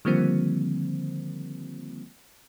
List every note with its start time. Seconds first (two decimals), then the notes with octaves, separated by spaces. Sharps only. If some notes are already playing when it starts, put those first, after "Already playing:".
0.05 D3 D#3 F3 G3 A#3 C4